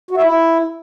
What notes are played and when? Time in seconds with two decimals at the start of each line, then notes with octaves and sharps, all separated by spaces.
0.11 F#4
0.17 E5
0.23 E4